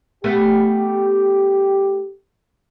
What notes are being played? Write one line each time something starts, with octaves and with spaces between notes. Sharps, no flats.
A3 B3 G4